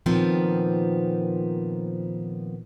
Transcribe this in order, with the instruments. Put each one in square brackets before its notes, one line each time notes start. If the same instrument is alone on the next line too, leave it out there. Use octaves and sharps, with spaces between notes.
[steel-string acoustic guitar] A#2 D#3 F3 B3 C4